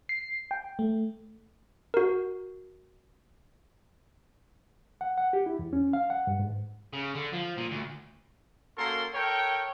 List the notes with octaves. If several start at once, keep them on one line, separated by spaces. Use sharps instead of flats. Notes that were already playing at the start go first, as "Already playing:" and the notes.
C7
G5
A3
F#4 A#4
F#5
F#5
G4
E4
E2
C#4
F5
F#5
G2
G#2
C#3
D3
F3
A#2
D2
A#3 C#4 F#4 A4 A#4 C6
A4 A#4 C#5 G5